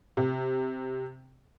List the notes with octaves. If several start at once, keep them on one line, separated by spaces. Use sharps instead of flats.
C3